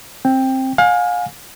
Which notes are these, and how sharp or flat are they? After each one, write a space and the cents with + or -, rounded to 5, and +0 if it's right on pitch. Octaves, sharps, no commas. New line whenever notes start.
C4 +15 G5 +10
F5 +35 G#5 -5